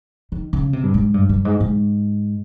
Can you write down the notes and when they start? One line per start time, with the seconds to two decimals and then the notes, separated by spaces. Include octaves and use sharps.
0.32 D#3
0.53 C#3
0.73 C3
0.83 G2
0.94 G#2
1.14 G2
1.29 G2
1.45 G#2
1.60 G#2